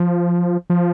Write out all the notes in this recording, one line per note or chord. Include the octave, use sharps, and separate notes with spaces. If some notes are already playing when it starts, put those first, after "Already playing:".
Already playing: F3
F3